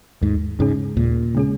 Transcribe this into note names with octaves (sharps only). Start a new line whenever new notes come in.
D#2 G#2
G#2 C#3 G#3 C#4 G#4
D#2 A#2
C#3 G#3 C#4 G#4